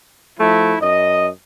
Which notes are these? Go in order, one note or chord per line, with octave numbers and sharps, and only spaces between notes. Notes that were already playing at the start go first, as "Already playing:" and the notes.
F3 A3 E4
F#2 D#5